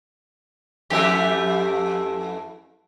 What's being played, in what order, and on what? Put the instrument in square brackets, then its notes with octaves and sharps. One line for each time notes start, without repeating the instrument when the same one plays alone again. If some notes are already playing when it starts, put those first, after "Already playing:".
[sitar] F2 E3 A3 [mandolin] G4 E5